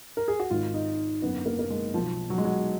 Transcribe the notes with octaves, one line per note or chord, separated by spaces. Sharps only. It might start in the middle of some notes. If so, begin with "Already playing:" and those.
A#4
G#4
F#4
G#1 G#2 D#3 F4
D#4
F#1 F#2 D3 B3
A#3
A#3
G#3
B1 B2 F3
F#3
G#3
F#3